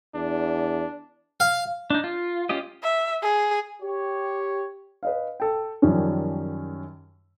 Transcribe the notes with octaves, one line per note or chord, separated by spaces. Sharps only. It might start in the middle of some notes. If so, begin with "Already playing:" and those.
E2 D4
F5
D4 D#4
F4
C#4 F4 G4 D#5
E5
G#4
G4 C#5
B4 D#5 F5
A4 G5
F#2 D#3 F3 G3 C#4